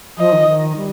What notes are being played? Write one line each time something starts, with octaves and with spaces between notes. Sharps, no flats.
F3 D#5
D#3
D#3
G3